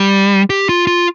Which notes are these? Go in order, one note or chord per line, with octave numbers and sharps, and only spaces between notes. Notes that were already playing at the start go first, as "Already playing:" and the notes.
Already playing: G3
G4
F4
F4